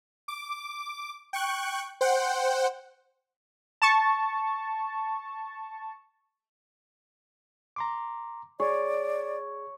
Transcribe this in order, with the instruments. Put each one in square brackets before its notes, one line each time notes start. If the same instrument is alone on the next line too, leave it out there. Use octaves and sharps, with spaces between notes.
[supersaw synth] D6
G5 C#6 F#6
C5 F#5 G5
[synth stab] A5 C#6
[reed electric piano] A#5 C6 D6
[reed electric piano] G#4 [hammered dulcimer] C#5 [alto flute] D5